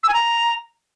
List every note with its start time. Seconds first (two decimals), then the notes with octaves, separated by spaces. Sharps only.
0.03 E6
0.08 G#5
0.13 A#5